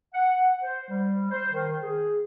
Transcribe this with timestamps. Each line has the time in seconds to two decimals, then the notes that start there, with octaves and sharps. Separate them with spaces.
0.13 F#5
0.62 C5
0.89 G3
1.30 C5
1.52 D#3
1.82 G#4